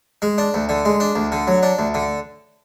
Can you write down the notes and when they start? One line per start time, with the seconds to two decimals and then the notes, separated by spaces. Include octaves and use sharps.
0.22 G#3
0.38 D4
0.54 D2
0.69 D3
0.85 G#3
1.00 D4
1.16 D2
1.32 D3
1.47 F#3
1.63 D4
1.78 D2
1.94 D3